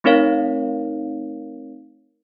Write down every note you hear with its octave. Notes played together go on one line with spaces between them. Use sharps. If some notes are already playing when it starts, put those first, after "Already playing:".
A3 C4 D#4 A#4 C#5 F5